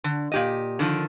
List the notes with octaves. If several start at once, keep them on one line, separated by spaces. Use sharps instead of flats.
D3
A#2 G4 D#5
D3 D#3 F3